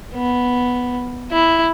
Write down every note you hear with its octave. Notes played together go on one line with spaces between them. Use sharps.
B3
E4